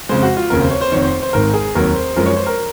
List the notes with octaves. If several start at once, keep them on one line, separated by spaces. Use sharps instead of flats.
F2 C#3 G#3 C5
F#4
F4
F1 D#2 C#3 A#4
C5
C#5
C5
F1 F2 D#3 C#5
C5
C5
G#1 G#2 D#3 A#4
G#4
F1 D#2 D#3 F#3 A#4
C5
F#2 F3 G#3 A#4
C#5
C5
A#4